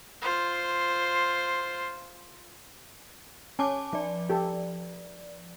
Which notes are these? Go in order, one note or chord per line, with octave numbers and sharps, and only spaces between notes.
F4 C5
C#4 G#5 A5 D6
F3 D5
G4 A4